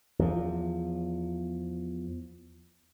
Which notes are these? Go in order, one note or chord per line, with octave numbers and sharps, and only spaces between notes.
E2 F3